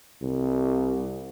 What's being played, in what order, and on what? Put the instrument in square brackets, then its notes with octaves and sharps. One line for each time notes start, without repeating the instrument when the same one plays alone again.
[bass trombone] C2